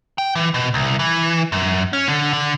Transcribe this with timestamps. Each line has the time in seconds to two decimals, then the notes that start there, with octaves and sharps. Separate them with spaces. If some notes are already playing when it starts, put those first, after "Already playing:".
0.18 G5
0.35 E3
0.54 B2
0.74 C2
0.99 E3
1.52 F#2
1.93 C#4
2.08 D3
2.33 D3